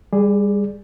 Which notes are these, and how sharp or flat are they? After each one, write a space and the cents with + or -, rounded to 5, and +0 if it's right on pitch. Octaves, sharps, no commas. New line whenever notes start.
G3 +35 G#4 +0 D5 +5